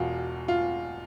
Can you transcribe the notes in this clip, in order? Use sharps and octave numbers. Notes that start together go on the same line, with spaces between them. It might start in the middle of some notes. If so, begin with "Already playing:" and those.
Already playing: E1 E2 B2 F4
F4